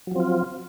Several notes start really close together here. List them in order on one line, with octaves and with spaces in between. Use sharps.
F#3 F3 C4 F4